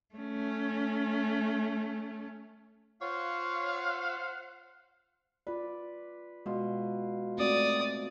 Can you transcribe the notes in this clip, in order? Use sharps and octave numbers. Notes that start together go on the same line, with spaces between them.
A3 C#4
F4 C5 C#5 F5 F#5
F4 B4 D5
B2 G#3 F4
A3 C4 F#4 D5 D#6